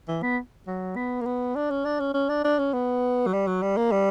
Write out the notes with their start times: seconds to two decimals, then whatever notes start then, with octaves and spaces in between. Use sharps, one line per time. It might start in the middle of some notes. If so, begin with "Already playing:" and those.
0.08 E3
0.23 B3
0.67 F#3
0.96 B3
1.21 A#3
1.25 B3
1.56 D4
1.70 C#4
1.85 D4
2.00 C#4
2.14 C#4
2.29 D4
2.45 D4
2.59 C#4
2.74 B3
3.26 F#3
3.33 G3
3.47 F#3
3.62 G3
3.77 A#3
3.92 G3